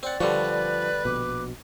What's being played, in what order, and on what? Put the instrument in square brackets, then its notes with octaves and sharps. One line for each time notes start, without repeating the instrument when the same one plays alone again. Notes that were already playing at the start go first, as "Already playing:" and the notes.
[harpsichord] C4 F#5 [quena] D5
[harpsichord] D3 G3 F#4 [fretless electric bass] F3 [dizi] B4
[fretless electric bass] A#1 B2 [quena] D6